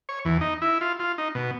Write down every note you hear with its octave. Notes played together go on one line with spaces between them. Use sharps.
C#5
E2
D#4
E4
F4
F4
D#4
B2